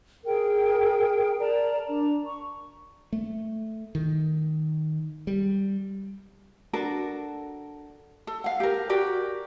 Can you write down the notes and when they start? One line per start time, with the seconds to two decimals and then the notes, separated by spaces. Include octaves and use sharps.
0.25 G#4 A#4 G5
1.39 A#4 D5 A5 A#5
1.88 D4 A#5
2.26 C#6
3.13 A3
3.95 D#3
5.27 G3
6.73 D4 F#4 A4 A#4
8.27 A4
8.44 F5 F#5
8.60 G4 A#4
8.89 F#4 G4 A#4 D5